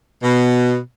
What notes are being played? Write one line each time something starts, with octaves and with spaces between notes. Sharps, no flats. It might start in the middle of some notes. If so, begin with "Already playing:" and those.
B2